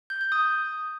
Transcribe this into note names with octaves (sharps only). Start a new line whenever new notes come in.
G6
G6
D#6